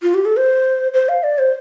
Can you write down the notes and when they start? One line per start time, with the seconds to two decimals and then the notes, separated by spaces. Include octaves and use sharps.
0.02 F4
0.14 G4
0.25 A4
0.37 C5
0.94 C5
1.09 F5
1.23 D5
1.39 C5